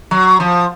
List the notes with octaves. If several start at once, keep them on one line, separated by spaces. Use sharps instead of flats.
F#3
F3